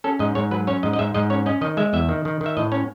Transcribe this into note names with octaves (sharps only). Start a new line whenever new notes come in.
C#4 A4
G#2 D#5
G#2 C#5
F#3 B4
C#4 C#5
G#2 D#5
D#5
G#2 E5
G#2 D#5
C#4 C#5
C#4 D#5
D#3 D#5
G#3 E5
E2 E5
D#3
D#3
D#3
E5
A2 D#5
C#4 C#5